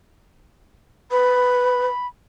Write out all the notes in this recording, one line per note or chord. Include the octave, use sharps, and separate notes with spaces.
B4 B5